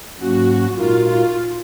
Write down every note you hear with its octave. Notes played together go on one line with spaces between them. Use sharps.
G#2 F#3 A#3 C#4 F#4
A#2 G#3 D#4 F4 F#4 A#4
F4